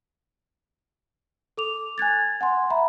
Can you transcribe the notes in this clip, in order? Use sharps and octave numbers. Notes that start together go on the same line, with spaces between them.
A4 D6 F7
G#5 F#6 G#6 A6
F#5 G#5 C6
E5 A#5 B5